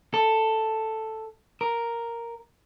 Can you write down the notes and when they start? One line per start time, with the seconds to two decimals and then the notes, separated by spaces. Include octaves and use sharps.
0.14 A4
1.61 A#4